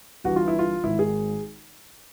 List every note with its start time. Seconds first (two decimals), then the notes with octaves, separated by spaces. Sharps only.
0.24 G1 G2 E3 F#4
0.36 F4
0.48 E4
0.59 F4
0.83 G#1 G#2 D#3 E4
0.99 G#4